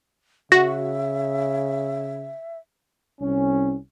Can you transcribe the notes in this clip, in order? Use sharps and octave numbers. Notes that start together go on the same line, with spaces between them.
C#3 F#4 E5 A#6
C2 C#4